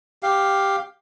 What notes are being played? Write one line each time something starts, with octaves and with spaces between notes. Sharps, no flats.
G4 F5